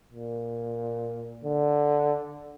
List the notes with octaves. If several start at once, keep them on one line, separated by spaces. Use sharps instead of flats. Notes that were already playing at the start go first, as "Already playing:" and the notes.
A#2
D3